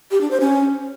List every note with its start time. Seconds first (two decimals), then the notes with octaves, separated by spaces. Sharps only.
0.11 G4
0.21 D4
0.31 C5
0.41 C#4